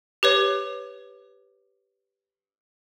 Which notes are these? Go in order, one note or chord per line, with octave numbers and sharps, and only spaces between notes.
G4 B4 C#5